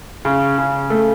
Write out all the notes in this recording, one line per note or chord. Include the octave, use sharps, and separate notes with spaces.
C#3
C#3
A3